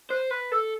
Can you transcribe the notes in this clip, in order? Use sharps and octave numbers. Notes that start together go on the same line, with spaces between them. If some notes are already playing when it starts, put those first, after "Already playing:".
C5 F#6
B4 F#6
A4 E6